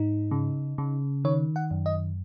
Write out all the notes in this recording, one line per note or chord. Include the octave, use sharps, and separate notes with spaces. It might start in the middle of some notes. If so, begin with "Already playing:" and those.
Already playing: G#2 D#4
C#3
C#3
D#3 C#5
F#5
F#2
D#5